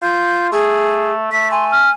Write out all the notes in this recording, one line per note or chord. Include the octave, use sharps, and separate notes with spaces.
F4 G6
A3 G#4
A3 B6
G#5 C6
F6